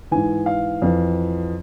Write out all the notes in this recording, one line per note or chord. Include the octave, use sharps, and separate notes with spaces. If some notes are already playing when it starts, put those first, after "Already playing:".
G#2 E3 G#5
F5
F2 E3